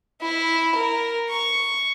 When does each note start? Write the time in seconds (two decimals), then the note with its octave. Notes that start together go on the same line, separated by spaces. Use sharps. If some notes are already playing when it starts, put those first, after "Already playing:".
0.21 E4
0.75 A#4
1.30 C#6